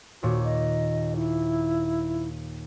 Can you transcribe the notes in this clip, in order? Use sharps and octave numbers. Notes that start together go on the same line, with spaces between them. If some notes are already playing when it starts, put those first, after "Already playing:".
D#2 A#2 F#4 C#5
D#5
E4